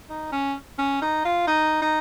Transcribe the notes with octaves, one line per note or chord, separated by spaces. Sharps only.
D#4
C#4
C#4
D#4
F4
D#4
D#4